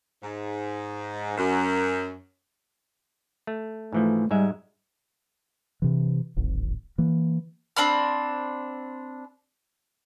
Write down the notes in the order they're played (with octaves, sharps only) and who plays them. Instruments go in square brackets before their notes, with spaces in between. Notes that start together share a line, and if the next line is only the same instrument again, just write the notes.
[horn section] G#2
F#2
[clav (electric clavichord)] A3
[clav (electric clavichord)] G#2 E3 F3 [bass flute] A3
[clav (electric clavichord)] G#2 G#3 E5 [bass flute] G3
[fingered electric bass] C3 E3
D1 G#1
E3 A#3
[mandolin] C4 D4 B5 F6